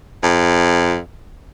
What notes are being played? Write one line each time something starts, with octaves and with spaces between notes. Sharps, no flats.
F2